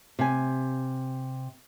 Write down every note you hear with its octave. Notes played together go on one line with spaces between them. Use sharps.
C3 G#5